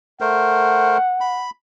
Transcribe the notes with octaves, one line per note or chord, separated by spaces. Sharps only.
A3 A#4 C5 F#5
B5